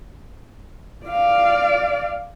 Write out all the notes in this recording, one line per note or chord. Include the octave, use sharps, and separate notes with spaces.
D5 F5